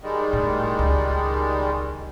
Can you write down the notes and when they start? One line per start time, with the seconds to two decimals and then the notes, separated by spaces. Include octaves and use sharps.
0.02 D#3 G3 G#3
0.33 A2
0.79 C#2